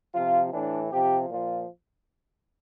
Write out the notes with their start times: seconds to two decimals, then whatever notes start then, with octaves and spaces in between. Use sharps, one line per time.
0.14 C3 F3 F4
0.53 A2 E3 D4
0.90 C3 F3 G4
1.29 A#2 F3 F4